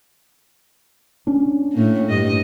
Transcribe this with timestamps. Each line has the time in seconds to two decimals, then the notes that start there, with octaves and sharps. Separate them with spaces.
1.27 C#4 D4
1.72 A2 A#3
2.10 G2 D#5